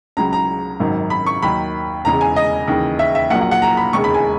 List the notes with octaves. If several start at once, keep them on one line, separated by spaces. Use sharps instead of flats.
C#2 C#3 F#3 A#5
A#5
G#1 F#2 D#3 F#3
B5
C#6
D#2 D#3 F#3 B5
E1 E2 C#3 G#3 A#5
G#5
D#5
D#2 C#3 E3
E5
E5
A#1 A#2 F#3 F#5
F#5
F#5
A#5
B5
E1 D#2 C#3 G#3 C#6
B5
G#5